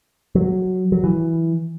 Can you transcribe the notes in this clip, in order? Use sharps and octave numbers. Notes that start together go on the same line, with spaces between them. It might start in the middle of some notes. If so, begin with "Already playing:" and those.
F#3
F#3
E3